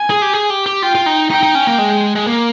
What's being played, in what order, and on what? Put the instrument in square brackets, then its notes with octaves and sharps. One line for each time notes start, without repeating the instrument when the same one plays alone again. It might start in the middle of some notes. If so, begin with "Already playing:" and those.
Already playing: [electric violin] G#5
[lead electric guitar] G#4
G4
G#4
G4
G4
[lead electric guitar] F4 [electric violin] G5
[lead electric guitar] F4
D#4
[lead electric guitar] D#4 [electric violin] G5
[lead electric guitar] D#4
C#4
A#3
G#3
G#3
A#3